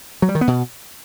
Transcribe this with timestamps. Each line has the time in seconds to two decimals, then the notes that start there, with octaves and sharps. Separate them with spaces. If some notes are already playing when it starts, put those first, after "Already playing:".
0.22 F#3
0.29 G3
0.35 D#3
0.41 B3
0.48 B2